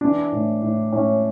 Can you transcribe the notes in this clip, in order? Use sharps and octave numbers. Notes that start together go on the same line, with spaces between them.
E3 D4
A2
A2
A2 C#4